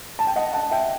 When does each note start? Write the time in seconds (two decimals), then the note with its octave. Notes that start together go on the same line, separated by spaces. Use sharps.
0.19 A5
0.27 G5
0.36 D#5 F#5
0.53 F#5 A5
0.71 E5 G5